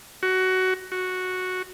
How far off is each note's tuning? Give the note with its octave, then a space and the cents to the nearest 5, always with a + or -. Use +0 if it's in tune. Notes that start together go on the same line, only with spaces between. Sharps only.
F#4 +15
F#4 -5